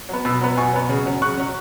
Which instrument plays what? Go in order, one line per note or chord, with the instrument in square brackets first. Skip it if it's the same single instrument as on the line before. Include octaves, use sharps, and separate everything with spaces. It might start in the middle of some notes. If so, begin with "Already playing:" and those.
[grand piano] F#3 B3
B2 B5 E6
F#3 B3
B2 G#5 C#6
F#3 B3
C#3
F#3 C#4
C#3 C#6 F#6
F#3 C#4